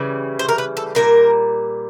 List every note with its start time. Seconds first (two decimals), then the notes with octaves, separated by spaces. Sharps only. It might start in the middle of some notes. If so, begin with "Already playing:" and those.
Already playing: C#3 E3 G3
0.39 C5
0.49 A#4
0.58 B4
0.77 A4
0.95 A#2 G3 A#4